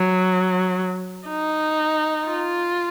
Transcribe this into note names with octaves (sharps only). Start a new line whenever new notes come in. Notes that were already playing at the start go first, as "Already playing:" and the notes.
Already playing: F#3
D#4
F4